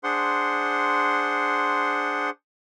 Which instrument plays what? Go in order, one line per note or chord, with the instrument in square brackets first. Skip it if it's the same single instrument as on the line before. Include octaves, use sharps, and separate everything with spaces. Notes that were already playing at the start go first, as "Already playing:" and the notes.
[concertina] D4 G#4 C5 F#5 C6